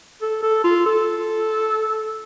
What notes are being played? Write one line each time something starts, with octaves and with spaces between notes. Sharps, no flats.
A4
A4
F4
A4